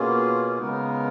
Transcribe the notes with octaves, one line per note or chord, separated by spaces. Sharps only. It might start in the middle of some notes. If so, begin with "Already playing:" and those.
Already playing: B2 A#3 C#4 F4 G#4
C#3 G#3 B3 D#4 A#4